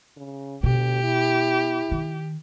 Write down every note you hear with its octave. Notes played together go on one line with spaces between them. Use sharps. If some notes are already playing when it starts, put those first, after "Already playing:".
C#3
D2 B2 G4
E4
D#3